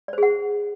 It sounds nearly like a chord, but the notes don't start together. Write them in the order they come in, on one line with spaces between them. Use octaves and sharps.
D5 C5 G#4 F#5